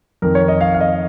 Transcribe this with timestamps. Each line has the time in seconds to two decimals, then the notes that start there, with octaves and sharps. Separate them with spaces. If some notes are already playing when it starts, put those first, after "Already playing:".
0.22 F2 D#3 A#4
0.35 C#5
0.48 D#5
0.61 F5
0.74 F5
0.81 D#5